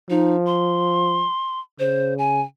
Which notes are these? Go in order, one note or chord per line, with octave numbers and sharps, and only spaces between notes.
F3 D#4
C6
C#3 C5
G#5